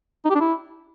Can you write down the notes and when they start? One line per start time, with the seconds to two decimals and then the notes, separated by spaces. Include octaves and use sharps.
0.25 D#4
0.30 G4
0.35 D4
0.40 E4